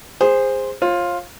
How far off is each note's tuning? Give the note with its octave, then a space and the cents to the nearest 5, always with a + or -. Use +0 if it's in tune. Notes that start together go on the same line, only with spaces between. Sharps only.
G#4 -25 C5 +0
F4 +5 C#5 -45